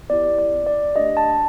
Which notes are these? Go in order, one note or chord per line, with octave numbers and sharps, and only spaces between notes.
B3 E4 G4 D5
D5
D5
A3 D4 G4 D#5
A5